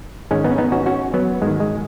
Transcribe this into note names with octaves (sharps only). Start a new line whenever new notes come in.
G#2 D#3 G#3 C#4
B3 D#4
C#4
B3 D#4
C#4 F#4
C#4 F#4
F#3 B3
G#2 D#3 G#3
G#3